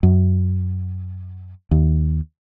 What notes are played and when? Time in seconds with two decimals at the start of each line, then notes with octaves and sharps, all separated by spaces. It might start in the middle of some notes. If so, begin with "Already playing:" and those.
0.03 F#2
1.71 D#2